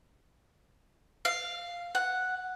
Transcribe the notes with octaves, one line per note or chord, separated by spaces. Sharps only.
F5
F#5